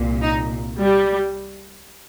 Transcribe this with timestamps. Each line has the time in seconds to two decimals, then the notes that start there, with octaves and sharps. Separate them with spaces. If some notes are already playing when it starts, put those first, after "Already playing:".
Already playing: C2 A#2
0.22 D#4
0.79 G3